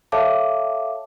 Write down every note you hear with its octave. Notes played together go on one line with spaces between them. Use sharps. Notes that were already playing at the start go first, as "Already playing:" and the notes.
A4 C#5 E5 F5 A5 D6